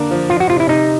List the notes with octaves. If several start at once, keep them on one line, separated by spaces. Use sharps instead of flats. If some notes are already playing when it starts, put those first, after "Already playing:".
Already playing: D3 A#3 D4
F3
F3 F4
F#4
C3 F4
E4
C3 D#4